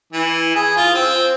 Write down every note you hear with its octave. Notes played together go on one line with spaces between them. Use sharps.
E3
G#4
F4
C4